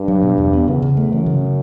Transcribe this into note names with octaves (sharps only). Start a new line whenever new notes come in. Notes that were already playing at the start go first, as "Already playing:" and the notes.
Already playing: G2
F#3
B2
E2
B3
E2 C#3
C#3
A3
F#2 E3
C#3
C#3